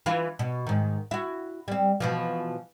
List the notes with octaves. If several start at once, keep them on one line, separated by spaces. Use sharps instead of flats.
E3 E4 F4
B2
G#2 D#3
E4 F#4
G3 C4
B2 E3 F3